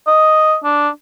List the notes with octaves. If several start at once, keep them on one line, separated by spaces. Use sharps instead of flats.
D#5
D4